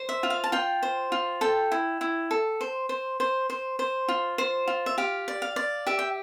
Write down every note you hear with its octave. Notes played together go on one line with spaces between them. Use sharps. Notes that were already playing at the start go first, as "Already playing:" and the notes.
Already playing: C5
E5
F4
F5
A5
F4 G5
C5
F4
A4 G5
E4
E4
A4
C5
C5
C5
C5
C5
F4
C5
F4
E5
G4 F5
D5
F5
D5
G4 E5
G5